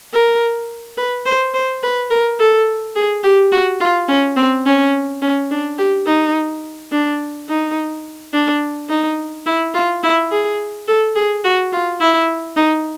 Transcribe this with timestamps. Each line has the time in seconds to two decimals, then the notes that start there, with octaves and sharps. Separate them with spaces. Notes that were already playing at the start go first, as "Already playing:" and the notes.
0.13 A#4
0.97 B4
1.26 C5
1.54 C5
1.83 B4
2.10 A#4
2.39 A4
2.96 G#4
3.23 G4
3.52 F#4
3.80 F4
4.08 C#4
4.37 C4
4.66 C#4
5.22 C#4
5.51 D4
5.78 G4
6.06 D#4
6.92 D4
7.49 D#4
8.33 D4
8.89 D#4
9.46 E4
9.74 F4
10.03 E4
10.31 G#4
10.87 A4
11.15 G#4
11.44 F#4
11.72 F4
12.00 E4
12.56 D#4